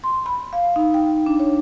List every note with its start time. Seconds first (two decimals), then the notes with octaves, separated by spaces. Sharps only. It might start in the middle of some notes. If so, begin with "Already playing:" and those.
0.04 C6
0.26 B5
0.53 F5
0.76 D#4
0.94 G5
1.26 D4
1.40 C#5